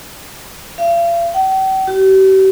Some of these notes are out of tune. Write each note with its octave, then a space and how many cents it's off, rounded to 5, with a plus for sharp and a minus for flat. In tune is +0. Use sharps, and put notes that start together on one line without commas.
F5 -40
G5 -45
G4 -40